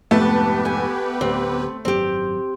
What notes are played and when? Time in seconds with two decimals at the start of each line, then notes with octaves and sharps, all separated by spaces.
0.11 F2 G#2 C3 A3 B3 G4 B4 A5
0.65 G#5
1.21 D1 D2 C4
1.85 G#1 F#2 C4 G4